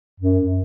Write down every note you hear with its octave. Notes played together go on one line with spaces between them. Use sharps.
F#2